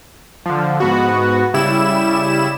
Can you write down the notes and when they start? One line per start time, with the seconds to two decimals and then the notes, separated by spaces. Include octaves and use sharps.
0.46 D3 F3
0.80 G#2 B3 F#4
1.54 C#3 G3 E4 E7